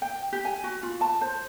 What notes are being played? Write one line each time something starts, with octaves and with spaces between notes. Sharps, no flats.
G5
G4
G#5
F#4
F4
A5
C5